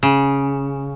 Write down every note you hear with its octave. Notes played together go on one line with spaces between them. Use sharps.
C#3